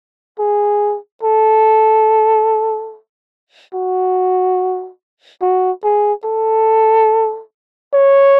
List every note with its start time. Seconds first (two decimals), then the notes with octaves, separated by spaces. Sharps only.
0.40 G#4
1.23 A4
3.74 F#4
5.42 F#4
5.84 G#4
6.25 A4
7.93 C#5